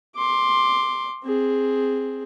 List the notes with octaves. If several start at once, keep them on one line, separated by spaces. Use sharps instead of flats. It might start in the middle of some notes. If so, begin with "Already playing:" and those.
C6 D6
C4 G#4